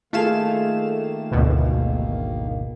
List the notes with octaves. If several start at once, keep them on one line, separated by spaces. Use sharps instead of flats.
D#3 A3 A#3 F4 G#4 A4 F5 E7
G#1 D2 B2